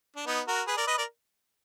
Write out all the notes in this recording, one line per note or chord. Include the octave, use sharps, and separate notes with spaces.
D4
B3 D#4
F#4 A#4
G#4 B4
A#4 D5
B4 D#5
A#4 D5